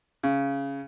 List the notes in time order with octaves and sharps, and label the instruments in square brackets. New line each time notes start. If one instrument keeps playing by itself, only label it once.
[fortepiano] C#3